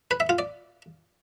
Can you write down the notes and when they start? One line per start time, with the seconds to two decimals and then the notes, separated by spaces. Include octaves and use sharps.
0.11 B4
0.20 E5
0.29 F4
0.39 D5